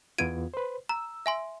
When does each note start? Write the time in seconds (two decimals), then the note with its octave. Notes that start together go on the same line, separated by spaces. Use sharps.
0.18 E2 B3 F4 G#6 D7 D#7
0.54 B4 C5
0.89 A#5 E6
1.26 E5 G#5 C6